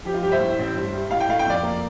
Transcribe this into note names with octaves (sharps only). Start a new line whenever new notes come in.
F3 G4
F4
G2 G4
C5 E5
A2
A1
G2
G3
A2 F5
G5
A3 F5
G5
F2 D5 F5
A#3